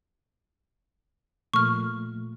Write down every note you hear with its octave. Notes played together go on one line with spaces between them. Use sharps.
A#2 F3 A3 C#6 F6